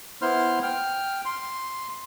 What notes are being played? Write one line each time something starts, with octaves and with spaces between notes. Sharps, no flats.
B3 E4 C5 C6 F6
G5 F6
C6